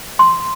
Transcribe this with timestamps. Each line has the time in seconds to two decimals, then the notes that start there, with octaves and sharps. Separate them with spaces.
0.19 C6